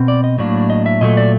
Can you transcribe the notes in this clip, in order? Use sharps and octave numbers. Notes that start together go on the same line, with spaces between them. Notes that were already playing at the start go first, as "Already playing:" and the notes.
Already playing: B2 C4
D5
D#5
A2 F#3 A#3 D4 D5
D#5
E5
A#2 F#3 A3 D#5
D5